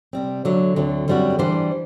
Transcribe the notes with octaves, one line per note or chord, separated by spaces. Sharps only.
C3 G3 C4
D3 F#3 A3
D2 D3 F#3 C4
F#2 D3 G3 C4 F#4
E3 G3 D4 G4 C5